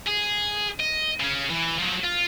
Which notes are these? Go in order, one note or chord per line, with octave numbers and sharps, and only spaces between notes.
G#4
D#5
C#3 C#4
E3
F3 F#3
F4